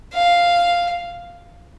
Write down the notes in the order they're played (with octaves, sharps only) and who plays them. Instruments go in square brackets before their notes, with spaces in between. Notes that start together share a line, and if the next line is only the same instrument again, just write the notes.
[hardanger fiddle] F5